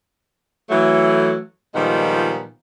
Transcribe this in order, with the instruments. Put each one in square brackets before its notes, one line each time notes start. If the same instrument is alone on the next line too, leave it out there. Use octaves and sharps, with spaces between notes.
[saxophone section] E3 F#3 A3
A#2 D#3 F3 G3 G#3 B3